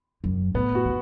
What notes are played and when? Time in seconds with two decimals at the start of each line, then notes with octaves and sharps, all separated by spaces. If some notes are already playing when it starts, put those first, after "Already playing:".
0.24 F#2
0.54 A2 B3
0.75 F#4
0.85 D#3